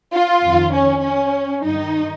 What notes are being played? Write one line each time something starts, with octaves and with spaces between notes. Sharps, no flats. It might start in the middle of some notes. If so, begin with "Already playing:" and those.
F4
F2 D#3
C#4
C#4
G2 D#4
D#3